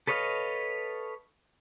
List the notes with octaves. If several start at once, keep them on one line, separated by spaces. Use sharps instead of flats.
A4 B4 C#5 D#5 F5